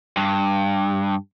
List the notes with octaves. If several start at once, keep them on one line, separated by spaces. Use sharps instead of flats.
G2